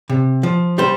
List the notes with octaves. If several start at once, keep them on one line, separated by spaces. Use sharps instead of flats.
C3
F3
G3 C5